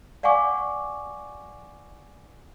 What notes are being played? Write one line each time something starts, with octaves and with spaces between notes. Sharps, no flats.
D5 F5 F#5 G#5 C#6 D6